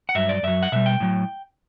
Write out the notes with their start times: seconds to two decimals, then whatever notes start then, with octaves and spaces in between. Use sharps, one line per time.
0.09 F#5
0.15 G2 F#3 E5
0.29 D5
0.43 F#2 F#3 E5
0.63 F#5
0.72 B2 G3 E5
0.86 G5
1.00 A2 F#3